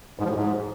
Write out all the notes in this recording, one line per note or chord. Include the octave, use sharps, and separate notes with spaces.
G#2
F3
A2
G#2